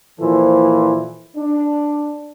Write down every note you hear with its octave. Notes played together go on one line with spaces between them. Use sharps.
A#2 E3 F3 A4 C5
D4